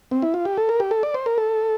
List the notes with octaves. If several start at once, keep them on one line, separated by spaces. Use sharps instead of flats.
C4
E4
F4
G4
A4
A#4
G4
A4
D5
C5
A#4
A4